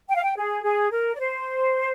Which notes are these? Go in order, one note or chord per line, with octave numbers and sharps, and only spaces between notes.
G5
F5
G5
G#4
G#4
A#4
D5
C5